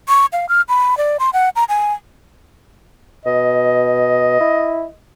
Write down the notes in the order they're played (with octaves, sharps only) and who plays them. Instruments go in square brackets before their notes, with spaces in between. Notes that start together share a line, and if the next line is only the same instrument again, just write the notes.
[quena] C#6
F5
F6
B5
D5
C6
F#5
A#5
G#5
[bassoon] B2 [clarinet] D#5
[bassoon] E4